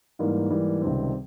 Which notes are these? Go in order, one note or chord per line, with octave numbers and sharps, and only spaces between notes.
G#2 E3 G3 A#3
G#2 E3 G3 A#3
C#2 C3 D#3 G3 C4